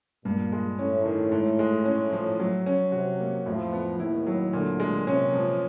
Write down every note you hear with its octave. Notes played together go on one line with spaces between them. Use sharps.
G2 A#2
G#3
A2 C#4
D#3
G#2
G#3
C#4
F3
F#3
C#4
C3 F#4
A#3
F2 A2 F3
B3
D#2 D#3 E4
F#3
D2 A#2 D3
G#3
C3 C#4
F3